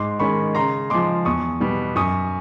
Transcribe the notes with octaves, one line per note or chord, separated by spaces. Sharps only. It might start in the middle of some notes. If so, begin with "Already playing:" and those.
Already playing: G#2 C6 D6
D#3 G#3 C#4 B5 C#6
C#3 A#5 C6
F3 G#3 C6 D6
E2 C#6 D#6
B2 G3 B3
F#2 C#6 D#6